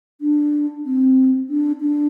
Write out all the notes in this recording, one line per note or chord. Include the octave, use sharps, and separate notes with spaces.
D4
C4
D4
D4